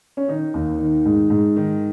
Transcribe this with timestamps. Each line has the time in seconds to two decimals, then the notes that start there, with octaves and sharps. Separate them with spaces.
0.17 C#4
0.28 D#3 D#4
0.54 D#2
0.79 D#3
1.06 G#2
1.30 G#2
1.57 D#3